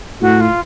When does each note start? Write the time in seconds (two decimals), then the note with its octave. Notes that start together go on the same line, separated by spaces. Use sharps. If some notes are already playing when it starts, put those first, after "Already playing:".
0.21 A2 F#4
0.40 F4